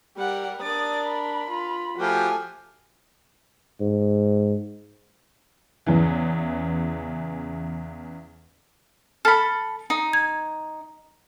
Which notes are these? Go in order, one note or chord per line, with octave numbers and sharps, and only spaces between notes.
G3 G4 A#4 F#5
D4 A#4 D5 D#6 A6
B5
F4
F3 A3 F#4 G4 G#5
G#2
E2 C#3 E3
A4 B5 F6
D#4
G#6